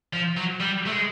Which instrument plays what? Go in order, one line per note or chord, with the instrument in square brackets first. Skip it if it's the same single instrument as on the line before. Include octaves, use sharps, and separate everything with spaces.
[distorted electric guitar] F3
F#3
G3
A3
G#3